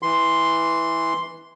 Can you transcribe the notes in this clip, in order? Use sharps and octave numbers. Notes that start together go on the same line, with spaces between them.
E3 C6